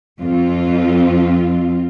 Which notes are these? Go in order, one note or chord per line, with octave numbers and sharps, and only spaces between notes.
F2 F3 C4 F4